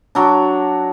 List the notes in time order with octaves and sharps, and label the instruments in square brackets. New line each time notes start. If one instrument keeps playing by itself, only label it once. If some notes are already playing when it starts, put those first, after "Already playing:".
[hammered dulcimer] F#3 D4